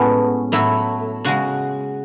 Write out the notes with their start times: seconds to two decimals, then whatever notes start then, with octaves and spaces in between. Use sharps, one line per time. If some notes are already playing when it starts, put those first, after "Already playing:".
Already playing: A2 G#3 B3 C#4
0.52 A2 F#3 A3 E4
1.24 C#3 G#3 F#4